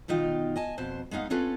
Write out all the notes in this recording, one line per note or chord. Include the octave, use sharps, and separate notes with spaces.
B2 D#3 D#4 F4 G5
D#5 G#5 A5
F2 B2 C5 A5
G#3 B3 D#4 F5 F#5
C4 C#4 F4 A4 B4 C#5